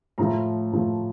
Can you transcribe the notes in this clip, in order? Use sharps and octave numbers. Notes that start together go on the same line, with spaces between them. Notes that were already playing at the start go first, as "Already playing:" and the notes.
A2 F3 A3 A#5
A2 F3 A3